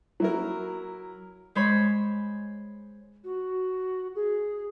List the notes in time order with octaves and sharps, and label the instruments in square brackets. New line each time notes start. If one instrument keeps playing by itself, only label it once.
[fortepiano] F#3 E4 A#4
[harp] G#3 C5 C#5 B5 C7
[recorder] F#4
G#4